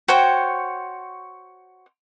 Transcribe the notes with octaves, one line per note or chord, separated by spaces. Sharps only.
F#4 C5 C#5 G5